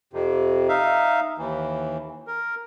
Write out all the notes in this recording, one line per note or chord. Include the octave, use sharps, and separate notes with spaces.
F2 C3
D#4 E5 F5
D#2 E3
A#4